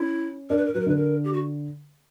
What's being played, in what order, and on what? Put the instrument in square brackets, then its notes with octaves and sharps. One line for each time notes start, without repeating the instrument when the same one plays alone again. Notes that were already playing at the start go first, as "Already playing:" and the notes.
Already playing: [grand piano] C#4 [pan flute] E4
[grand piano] D4 [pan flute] A#4
[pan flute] B4
A#4
[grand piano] F#3 [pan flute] B4
[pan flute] A#4
[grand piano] D3 [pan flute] B4
[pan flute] A#4
G4
F#4